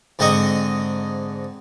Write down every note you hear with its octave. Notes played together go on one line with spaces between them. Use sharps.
G#2 D3 C4 D#5 C#6 D#6